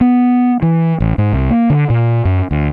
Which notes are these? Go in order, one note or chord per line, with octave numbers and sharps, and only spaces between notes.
B3
E3
A1
G#2
C2
A#3
D3
A#2
F#2
D2